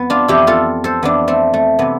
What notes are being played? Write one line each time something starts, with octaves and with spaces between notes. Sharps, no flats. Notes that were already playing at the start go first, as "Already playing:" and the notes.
Already playing: F2 B3
D4 F4
F2 E3 E4 G4
F4 A4
A4 C5
F2 E3 B3 D4
A3 C4
A3
C3 E3 B3